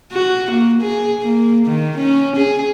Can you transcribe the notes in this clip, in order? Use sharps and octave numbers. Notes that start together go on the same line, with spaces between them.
F#4
A#3
G#4
A#3
D#3
C#4
G#4